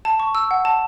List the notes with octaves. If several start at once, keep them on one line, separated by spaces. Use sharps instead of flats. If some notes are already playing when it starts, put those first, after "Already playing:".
A5
C#6
E6
F#5
A5